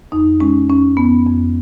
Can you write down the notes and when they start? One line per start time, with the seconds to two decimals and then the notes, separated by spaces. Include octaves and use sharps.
0.12 F2 D#4
0.40 G#3 C#4
0.70 F2 C#4
0.97 F2 B3
1.26 F2